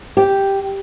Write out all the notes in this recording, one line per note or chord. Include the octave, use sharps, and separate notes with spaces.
G4